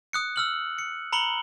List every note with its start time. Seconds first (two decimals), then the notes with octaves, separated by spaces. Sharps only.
0.13 D#6 F#6 C#7
0.36 E6 F6 F#7
0.79 C#7
1.13 A#5 B5 C#7 F#7 G7